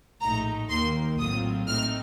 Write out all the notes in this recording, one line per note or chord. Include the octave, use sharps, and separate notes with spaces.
A#1 A2 A3 D#4 A#5
D#2 D#3 A#3 C6
A#1 A2 F#3 C4 F4 D#6
A2 A3 C4 D#4 F6